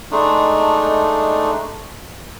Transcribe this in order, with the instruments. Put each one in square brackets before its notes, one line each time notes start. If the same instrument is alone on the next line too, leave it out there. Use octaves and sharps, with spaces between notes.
[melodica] G#3 A3 D4 D#4